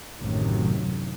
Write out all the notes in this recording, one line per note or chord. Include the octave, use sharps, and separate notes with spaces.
A1 F#2 A2 C3 D#3 F#3